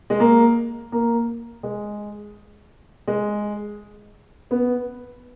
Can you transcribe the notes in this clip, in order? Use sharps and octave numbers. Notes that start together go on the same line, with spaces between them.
G#3
A#3
A#3
G#3
G#3
B3